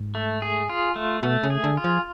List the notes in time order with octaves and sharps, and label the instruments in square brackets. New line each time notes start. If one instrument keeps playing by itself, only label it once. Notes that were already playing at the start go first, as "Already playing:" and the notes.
Already playing: [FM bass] G#2
[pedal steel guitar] A3
G#4
F4
A3
[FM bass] B2 [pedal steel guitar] A3
[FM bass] C#3
[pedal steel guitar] G#4
[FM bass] D3
[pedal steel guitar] F4
[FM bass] F3